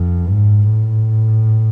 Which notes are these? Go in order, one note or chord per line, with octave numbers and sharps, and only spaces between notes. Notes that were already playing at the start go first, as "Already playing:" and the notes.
Already playing: F2
G#2
A2